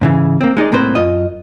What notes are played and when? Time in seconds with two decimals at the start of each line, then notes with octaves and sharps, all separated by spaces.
0.01 G#2 C#3 E3
0.41 A#3 C4
0.57 G#3 D#4 G#4 D5
0.72 C2 A2 A#3 C4 B4 C5
0.95 F#2 F4 D#5